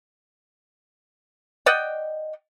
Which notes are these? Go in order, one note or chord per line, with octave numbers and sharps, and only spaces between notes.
D5 D#5 F#5 G5